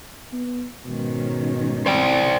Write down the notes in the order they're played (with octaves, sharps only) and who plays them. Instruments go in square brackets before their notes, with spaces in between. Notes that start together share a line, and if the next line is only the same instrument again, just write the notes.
[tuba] B3
[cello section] G#2 D#3 C#4 [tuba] B2
[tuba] C4 [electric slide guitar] C5 D5 G5